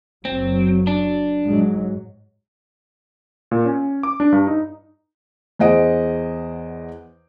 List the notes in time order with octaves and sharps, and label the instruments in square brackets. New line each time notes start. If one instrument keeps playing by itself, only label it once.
[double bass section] F#1 F#3 [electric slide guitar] C4
[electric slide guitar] D4
[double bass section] G#2 F#3
[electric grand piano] A#2
C#4
D6
D4
G2
D#4
[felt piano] E2 G#4 C5 D#5 F#5 D7